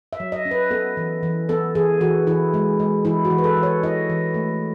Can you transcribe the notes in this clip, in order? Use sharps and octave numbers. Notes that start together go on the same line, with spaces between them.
E5
F#3
D#5
C#4
B4
B3 A4
E3
E3
B3 A4
E3 G#4
E3 F#4
E3 E4
G#3
G#3
E3 E4
F#4
E3
B4
A4
E3
C#5
E4 D#5
E3
A3